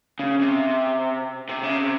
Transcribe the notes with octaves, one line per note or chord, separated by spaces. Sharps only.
C#3
C3
C3
C#3
C3